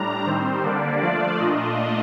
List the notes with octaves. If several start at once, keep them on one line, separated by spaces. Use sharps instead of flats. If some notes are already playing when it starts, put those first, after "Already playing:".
Already playing: A2 G3 D4 A#5
D#3 G3 C4 C5
D3 G3 A#3 D4 D5
F3 A3 D4 F4 D5
A#2 A3 D4 F4 D#5